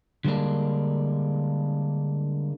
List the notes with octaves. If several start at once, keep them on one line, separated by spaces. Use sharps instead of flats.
D3 G3 G#3 A#3 D4